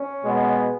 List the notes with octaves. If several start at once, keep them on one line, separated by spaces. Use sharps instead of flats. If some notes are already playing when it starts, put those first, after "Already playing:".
Already playing: C#4
B2 G#3 B3